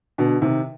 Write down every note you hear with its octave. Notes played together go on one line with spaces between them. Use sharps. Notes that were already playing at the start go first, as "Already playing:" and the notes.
B2 D3
C3 D#3